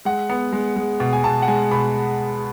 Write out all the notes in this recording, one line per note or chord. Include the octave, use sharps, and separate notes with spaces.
G#3 F#5
B3
G#3
G#3
B2
G#5
B2 A5
F#5
G#3 G#5
B2 B5